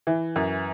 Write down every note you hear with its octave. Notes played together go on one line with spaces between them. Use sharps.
E3
F#2